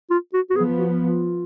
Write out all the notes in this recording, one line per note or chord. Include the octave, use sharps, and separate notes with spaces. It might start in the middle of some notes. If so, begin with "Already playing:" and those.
F4
F#4
F#4
F3 B3 G#4
F#4
F4